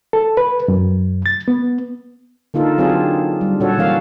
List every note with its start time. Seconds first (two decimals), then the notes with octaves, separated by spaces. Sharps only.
0.13 A4
0.37 B4
0.68 F#2
1.26 A6
1.48 B3
2.54 D3 A#3 D#4 F4 A4
2.78 F#3 C4 D4 F4 G#4
3.41 G3
3.60 A#2 D4 F#4 A4 C#5
3.78 E3 A#3 C#4 F5